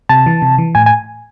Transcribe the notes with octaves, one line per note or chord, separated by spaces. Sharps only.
C3 A5
E3
C3
E3
A2 G#5
G#5